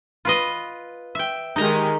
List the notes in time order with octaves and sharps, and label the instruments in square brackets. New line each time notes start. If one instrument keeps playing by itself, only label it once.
[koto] F4 B4 D#5
E5 G5
[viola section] D#3 G#3 G4 [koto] D#4 A#5